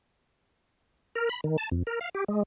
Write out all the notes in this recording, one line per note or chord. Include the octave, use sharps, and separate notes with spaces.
A#4
B5
D#3
A5
F2
A#4
F5
G4
G#3